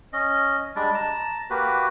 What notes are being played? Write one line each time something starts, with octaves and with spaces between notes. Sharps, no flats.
C#4 D#5
G3 G#3 D4 D5
A5 A#5
A#3 F#4 G4 B4